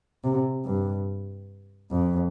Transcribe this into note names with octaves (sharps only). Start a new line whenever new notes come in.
C3
G2
F2